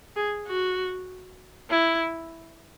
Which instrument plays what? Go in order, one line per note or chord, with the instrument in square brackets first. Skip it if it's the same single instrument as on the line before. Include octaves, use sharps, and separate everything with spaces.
[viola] G#4
F#4
E4